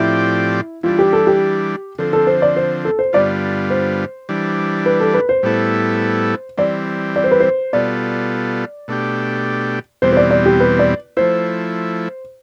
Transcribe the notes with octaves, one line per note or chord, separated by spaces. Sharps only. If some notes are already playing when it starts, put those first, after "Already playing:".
Already playing: A2 F3 C4 E4 G4 D5
E3 G3 D4 F4
G4
A4
G4
D3 F3 C4 A4
A4
C5
D5
C5
A4
C5
G2 D3 G3 B3 F4 D5
C5
E3 G3 D4
B4
A4
B4
C5
A2 G3 B3 E4 A4
E3 G3 C4 D5
D5
C5
B4
C5
B2 G3 B3 F4 A4 D5
B2 A3 D4 G4
E2 B2 G3 C4 C5
C5
D5
D5
G4
B4
D5
F3 A3 E4 C5